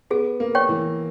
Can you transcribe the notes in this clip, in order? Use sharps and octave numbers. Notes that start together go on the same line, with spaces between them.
B3 G#4
A#3
C#5 G5 C#6
E3